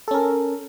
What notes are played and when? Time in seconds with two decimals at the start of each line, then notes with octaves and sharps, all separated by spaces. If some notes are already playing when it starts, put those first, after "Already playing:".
0.08 A4
0.11 C#4
0.14 A#4